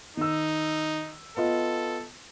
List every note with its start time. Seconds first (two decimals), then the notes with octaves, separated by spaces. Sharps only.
0.17 D#3 D#4 E6
1.37 B3 F4 A4 D#5